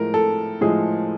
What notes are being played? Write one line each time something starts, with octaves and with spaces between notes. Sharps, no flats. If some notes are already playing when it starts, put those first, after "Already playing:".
Already playing: A2 F3 G#3 A#4
A4
A2 F3 G#3 G#4